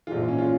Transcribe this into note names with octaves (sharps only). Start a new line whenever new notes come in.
A#1 G#2 E3 F4
C#4
F4